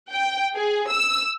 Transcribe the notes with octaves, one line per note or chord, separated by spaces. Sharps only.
G5
G#4
E6